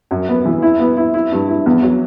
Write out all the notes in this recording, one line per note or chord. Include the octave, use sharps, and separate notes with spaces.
F#2
B3
E3
E4
B3
E4
E4
G2
E4
E2
F#3